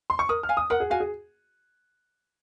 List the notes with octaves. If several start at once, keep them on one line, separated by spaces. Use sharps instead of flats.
C6
C#6
A#4 D#6
F6
F5 G#5
D#6
A#4 F#5
G#4
F#4 F5 G#5
G#4